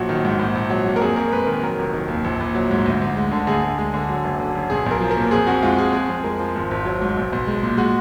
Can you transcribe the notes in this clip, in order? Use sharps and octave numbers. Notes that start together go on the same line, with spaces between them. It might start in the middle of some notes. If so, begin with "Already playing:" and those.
Already playing: A#1 F#3 F#4
D#3
G#2
A#1
A#1
F#3
A#2
A#4
F2 G#4
F2 A#4
G#3 B4
D#3 A#4
F#3 A#4
F1
D#3
D#2
A#1
A#1
F#3
G#2
D2
D2
G#3
D3
D2 G#4
D2
G#3
D3
F#3
F#1
D3
F#2
B1 G#4
B1 A#4
F3
A#4
A#2
F2 G#4
F2 F#4
G#3 F4
F3 G#4
F2 G#4
F2
G#3 A#4
F3
G#1
G#1
F#3
G#2
B1
B1
G#3
A#2
G#3 F#4